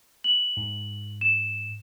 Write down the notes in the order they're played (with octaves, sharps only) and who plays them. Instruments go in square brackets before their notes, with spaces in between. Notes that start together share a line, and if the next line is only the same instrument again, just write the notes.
[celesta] F#7
[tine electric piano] G#2
[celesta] E7